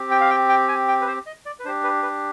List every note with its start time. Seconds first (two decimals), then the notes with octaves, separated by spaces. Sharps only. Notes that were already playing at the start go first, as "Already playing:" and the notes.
Already playing: C4 G4
0.11 G5
0.21 F5
0.30 G5
0.49 G5
0.68 G#5
0.88 G5
1.01 B4
1.07 C5
1.26 D#5
1.46 D5
1.60 B4
1.65 D4 C5
1.68 G4
1.84 B4
2.03 B4